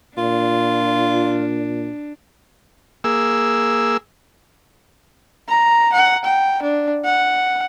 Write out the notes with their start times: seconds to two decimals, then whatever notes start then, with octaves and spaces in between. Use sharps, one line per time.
0.18 A#2 D4 F4
3.04 A#3 G#4 E6
5.49 A#5
5.93 F#5
6.25 G5
6.62 D4
7.05 F#5